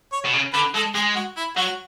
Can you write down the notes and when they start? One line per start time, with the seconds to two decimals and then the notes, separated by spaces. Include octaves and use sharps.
0.13 C#5
0.25 B2
0.33 C#3
0.53 D3 B4
0.75 G#3 A4
0.95 G#3 G#4
1.16 F#4
1.37 E4
1.57 F#3 F#4